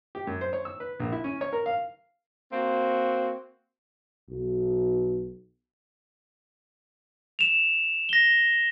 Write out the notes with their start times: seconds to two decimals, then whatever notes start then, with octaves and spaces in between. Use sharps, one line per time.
0.15 G4
0.27 F#2
0.41 C5
0.53 C#5
0.65 E6
0.80 B4
1.00 A#1
1.12 E4
1.24 C#4
1.41 C#5
1.53 A#4
1.66 F5
2.52 A#3 C4 F#4
4.30 B1
7.39 E7 F7
8.09 A#6 G7